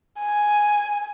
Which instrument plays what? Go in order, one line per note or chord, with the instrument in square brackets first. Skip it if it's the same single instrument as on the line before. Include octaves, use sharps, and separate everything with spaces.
[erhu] G#5